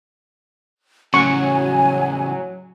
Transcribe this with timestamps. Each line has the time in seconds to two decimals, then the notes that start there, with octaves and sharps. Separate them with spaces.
1.14 A2 C#3 F#3 G#5 C#6